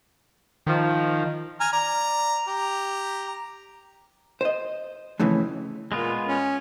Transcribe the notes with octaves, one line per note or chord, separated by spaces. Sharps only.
D#3 F3
G#5 A#5 F6
D5 A#5
G4 A#5
C5 D#5
F2 A2 C#3 E3
A#2 G#3 B3 F4
C#4